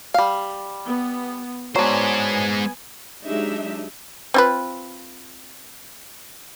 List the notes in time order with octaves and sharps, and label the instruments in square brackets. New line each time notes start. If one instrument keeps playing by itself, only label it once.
[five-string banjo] G3 F5
[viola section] B3
[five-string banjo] F#3 D4 [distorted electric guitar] G#3 C5 [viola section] B3 G#5
[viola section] F#3 G#3 D4 D#4 G4 E5
[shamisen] C4 F4 B4